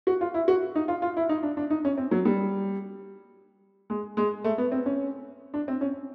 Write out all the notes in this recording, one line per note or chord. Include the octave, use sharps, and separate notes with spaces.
F#4
F4
E4
F#4
D#4
F4
F4
E4
D#4
D4
D4
D#4
C#4
C4
F#3
G3
G#3
G#3
A3
B3
C4
C#4
D4
C4
C#4